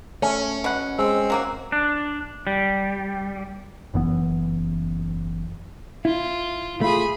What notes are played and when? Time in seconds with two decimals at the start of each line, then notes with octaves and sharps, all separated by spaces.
0.22 A3 C#4
0.64 B2 F#5
0.99 G#3 C4
1.30 F#3 A#3 F#4
1.72 D4
2.47 G3
3.94 F#1 F#2 E3 B3
6.05 E4 F4
6.81 A3 F4 G#4 B5